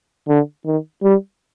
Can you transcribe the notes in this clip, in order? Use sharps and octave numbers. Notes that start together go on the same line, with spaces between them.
D3
D#3
G3